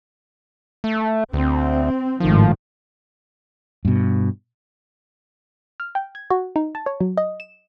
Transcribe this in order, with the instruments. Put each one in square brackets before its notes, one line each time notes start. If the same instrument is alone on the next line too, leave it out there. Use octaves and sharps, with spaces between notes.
[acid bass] A3
[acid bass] D2 [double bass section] C4
[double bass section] G#1 A2 D#3 [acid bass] F3
[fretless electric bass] G2 B2
[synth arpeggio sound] F6
G5
G#6
F#4
D#4
A5
C#5
F#3
D#5
E7